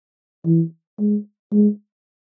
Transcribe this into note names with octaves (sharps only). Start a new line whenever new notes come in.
E3
G#3
G#3